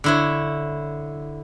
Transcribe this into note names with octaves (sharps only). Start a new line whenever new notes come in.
D3 E4 C#5